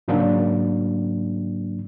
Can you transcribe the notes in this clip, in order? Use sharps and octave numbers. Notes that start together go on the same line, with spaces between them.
G#2 C#3 F#3 A#3 D4